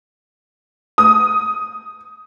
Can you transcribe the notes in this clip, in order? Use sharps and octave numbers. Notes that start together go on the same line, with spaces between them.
D#6